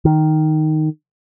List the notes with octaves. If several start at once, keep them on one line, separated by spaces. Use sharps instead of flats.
D#3